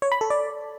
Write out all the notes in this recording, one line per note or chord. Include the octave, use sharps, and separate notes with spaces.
C#5
B5
A4
D5